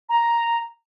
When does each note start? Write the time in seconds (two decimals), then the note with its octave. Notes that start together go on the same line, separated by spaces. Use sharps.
0.09 A#5